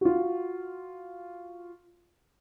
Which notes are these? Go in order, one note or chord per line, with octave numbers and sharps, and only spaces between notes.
F4 F#4